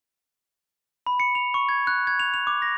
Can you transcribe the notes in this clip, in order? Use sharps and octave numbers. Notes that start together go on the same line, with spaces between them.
B5
C#7
F7
C#6
G#6
F#6
G#6
F7
F7
D6
A#6